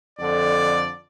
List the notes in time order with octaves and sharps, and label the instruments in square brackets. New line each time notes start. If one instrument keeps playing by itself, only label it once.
[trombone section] F2 D3 [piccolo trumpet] D5